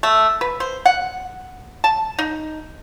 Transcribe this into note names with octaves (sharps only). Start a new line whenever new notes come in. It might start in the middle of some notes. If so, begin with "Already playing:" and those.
A3
B4
C5
F#5
A5
D#4